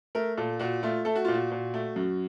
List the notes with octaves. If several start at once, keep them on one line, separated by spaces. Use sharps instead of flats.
A3 A#4
A#2 A4
A#2 F#4
A3 F4
A3 A4
F#4
A#2 F4
F#4
A#2
A3
F#2